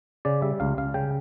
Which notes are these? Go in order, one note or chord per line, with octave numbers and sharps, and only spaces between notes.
C#3 D5
G3 E5
C#2 F5
C#2 F5
C#3 G5